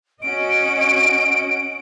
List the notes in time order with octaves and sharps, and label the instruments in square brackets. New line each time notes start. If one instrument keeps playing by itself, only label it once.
[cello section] C#4 F#4 D#5 [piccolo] D7